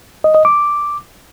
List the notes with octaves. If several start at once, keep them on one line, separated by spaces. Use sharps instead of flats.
D#5
D#5
D6